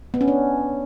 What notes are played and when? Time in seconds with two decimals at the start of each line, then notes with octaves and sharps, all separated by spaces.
0.14 B3
0.21 C#4
0.28 D4